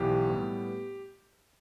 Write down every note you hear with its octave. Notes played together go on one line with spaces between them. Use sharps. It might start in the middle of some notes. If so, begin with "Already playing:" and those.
Already playing: B1 E3 B3 G4
A2 G3 B3